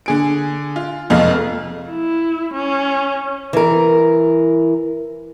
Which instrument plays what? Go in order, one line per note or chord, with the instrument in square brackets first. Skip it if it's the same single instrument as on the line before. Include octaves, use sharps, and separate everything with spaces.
[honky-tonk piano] D3 G#4 D7
F4
F1 F2 G#3 D#5 F5 F6
[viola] E4
C#4
[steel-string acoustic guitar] E3 A#4